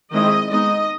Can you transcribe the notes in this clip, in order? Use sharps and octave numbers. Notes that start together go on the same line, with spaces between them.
D#3 G#3 C4 E4 D#5
G#3 B3 D#4 D#5